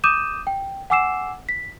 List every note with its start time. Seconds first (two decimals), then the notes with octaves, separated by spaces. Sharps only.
0.04 D6 D#6 G6 D#7 E7
0.47 G5
0.90 F#5 G#5 D6 E6 C7 E7
1.49 B6